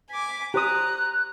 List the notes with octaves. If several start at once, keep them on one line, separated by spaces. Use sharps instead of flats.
G#5 D6 B6
G4 C5 A#5 D#6 F#6